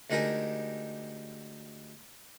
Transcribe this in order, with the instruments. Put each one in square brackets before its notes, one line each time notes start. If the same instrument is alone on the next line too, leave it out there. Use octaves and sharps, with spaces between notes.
[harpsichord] D2 G#3 D#4 G4 A#4 G#5